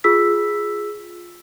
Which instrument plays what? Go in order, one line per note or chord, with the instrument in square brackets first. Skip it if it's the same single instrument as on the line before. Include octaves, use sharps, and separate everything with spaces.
[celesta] F4 G#4 E6 B6